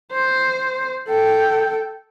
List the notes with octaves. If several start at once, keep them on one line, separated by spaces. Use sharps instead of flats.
C5
A4 G5